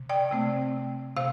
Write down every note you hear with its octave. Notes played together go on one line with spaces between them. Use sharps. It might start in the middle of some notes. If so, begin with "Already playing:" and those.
Already playing: C3
D5 G5
C3 A3 C4
C3 C5 F5